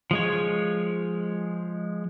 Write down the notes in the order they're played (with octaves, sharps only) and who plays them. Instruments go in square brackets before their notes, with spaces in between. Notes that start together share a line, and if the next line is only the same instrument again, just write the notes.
[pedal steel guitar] F3 G#3 C#5